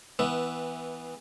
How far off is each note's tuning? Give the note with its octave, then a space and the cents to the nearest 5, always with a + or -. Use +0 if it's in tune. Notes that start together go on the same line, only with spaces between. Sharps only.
E3 -20 B3 +0 E5 +0